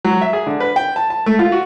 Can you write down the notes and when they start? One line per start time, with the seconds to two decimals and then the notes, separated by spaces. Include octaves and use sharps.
0.05 F#3
0.21 E5
0.33 G#4
0.47 D3
0.60 B4
0.76 G5
0.96 A5
1.10 A5
1.26 A3
1.39 F4
1.52 F#4